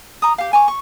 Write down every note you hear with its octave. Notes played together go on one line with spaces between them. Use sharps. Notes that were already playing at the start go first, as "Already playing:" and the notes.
A#5 D#6
G4 F5
G#5 C#6 D6
C#6